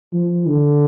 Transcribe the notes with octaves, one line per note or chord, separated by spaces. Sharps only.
F3
D3